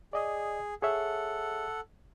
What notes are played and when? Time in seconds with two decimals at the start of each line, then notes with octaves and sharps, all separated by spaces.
0.13 G#4 D5 D#5 D#6
0.82 G#4 A4 C#5 E5 F#5